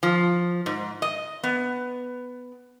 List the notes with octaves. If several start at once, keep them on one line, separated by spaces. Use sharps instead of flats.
F3
G#2
D#5
B3